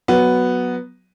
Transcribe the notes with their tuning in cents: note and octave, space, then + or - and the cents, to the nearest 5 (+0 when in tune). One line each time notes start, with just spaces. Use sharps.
F#3 +0 B3 +0